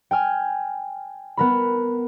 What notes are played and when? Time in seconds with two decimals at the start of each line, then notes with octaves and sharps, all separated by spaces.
0.11 G5 G#5 F6
1.37 B3 A#4 B5